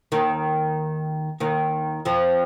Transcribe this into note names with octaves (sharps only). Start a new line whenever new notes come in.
D#2 D#3
D#2 D#3
F2 F3